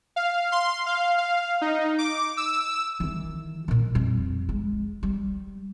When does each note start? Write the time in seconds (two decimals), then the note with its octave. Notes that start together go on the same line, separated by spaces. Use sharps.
0.16 F5
0.52 C6
0.86 F5
1.18 F5
1.61 D#4
1.98 D6
2.37 E6
3.00 D#3 E3
3.68 A#2 D#3
3.95 F2 G3
4.49 G#3
5.03 G3